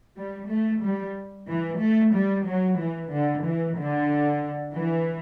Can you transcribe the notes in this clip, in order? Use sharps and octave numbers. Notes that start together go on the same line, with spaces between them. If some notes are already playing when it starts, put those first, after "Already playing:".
G3
A3
G3
E3
A3
G3
F#3
E3
D3
E3
D3
E3